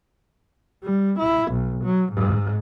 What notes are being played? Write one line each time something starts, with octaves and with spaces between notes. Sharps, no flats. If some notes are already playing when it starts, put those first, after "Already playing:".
G3
E4
B1
F#3
G#2